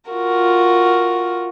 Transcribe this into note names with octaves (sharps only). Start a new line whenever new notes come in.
F4 F#4 A#4